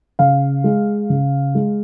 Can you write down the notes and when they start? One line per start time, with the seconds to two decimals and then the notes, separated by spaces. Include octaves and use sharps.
0.19 C#3 F5
0.64 G#3
1.10 C#3
1.55 G#3